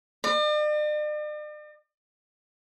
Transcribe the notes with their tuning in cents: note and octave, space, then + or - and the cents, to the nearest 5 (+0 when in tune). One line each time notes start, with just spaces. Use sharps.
D5 +45